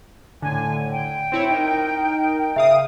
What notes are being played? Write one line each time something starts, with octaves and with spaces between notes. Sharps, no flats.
A2 D3 G#5
G5
C4 E4 C#5
D#4 A#4
C#3 E5 F5 D#6